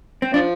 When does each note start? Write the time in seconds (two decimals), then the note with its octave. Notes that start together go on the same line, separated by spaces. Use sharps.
0.22 C4
0.33 F3 D4